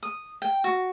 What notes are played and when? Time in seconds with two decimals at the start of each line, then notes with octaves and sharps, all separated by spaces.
0.03 D#6
0.42 G5
0.64 F#4